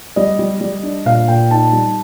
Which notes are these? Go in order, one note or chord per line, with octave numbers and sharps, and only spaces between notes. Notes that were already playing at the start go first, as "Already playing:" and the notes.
G3 D#5
G3
G3
D4
A#2 F5
A#2 G5
D#4 A5
G3